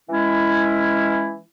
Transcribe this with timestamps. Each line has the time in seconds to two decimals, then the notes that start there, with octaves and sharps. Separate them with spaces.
0.09 E3 G#3 C#4 E4